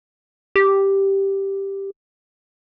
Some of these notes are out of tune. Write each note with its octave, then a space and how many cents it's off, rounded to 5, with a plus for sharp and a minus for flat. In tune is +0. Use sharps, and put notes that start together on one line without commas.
G4 +0